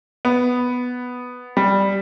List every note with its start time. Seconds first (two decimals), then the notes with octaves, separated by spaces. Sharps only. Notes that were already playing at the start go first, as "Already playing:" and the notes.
0.25 B3
1.57 G3